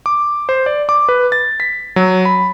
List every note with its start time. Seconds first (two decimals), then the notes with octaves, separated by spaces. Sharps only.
0.06 D6
0.49 C5
0.66 D5
0.89 D6
1.09 B4
1.32 A6
1.60 B6
1.96 F#3
2.25 B5